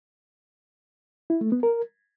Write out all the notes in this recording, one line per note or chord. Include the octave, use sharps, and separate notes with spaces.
E4
A3
B3
A#4